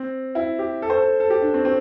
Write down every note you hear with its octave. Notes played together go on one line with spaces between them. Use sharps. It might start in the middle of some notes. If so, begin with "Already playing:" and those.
Already playing: C4
E4
G4
A4
C5
A4
A4
G4
D4
C4
C4